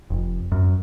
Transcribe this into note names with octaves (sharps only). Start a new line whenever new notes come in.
F1
F#2